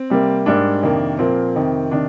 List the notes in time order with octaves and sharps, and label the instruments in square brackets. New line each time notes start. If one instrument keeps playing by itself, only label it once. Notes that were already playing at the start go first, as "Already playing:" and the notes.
Already playing: [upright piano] C4
C3 G3 A#3
G#2 G3 A#3 D4
F2 C3 D#3 A#3
A#2 F3 A#3 C4
F2 C3 D#3
C3 D#3 D4